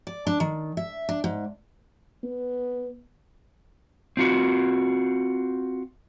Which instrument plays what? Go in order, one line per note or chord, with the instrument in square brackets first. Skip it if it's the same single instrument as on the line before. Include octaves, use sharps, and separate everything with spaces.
[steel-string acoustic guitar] D5
D4
D#3
E5
D4
G#2
[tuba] B3
[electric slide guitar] C4 F4 F#4